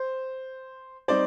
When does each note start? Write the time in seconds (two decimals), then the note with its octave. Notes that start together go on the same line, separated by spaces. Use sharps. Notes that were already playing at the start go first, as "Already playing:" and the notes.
Already playing: C5
1.08 G3 C4 D#4 C5 D5